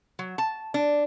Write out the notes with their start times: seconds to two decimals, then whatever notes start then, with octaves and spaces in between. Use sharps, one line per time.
0.19 F#3
0.38 A5
0.74 D4